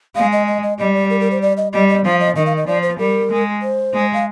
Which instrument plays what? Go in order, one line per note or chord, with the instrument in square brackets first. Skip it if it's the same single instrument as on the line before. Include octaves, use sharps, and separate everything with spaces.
[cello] G#3 [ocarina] F5
[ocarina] D#5
D#5
D#5
[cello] G3 [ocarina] D#5
[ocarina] D5
A#4
A#4
C5
D5
D#5
[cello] G3 [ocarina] D#5
[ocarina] D#5
[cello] F3 [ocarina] F5
[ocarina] D#5
[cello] D#3 [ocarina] D#5
[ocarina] F5
D#5
[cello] F3 [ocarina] D5
[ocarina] C5
[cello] G3 [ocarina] A#4
[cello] G#3
[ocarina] C5
[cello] G#3
[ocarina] F5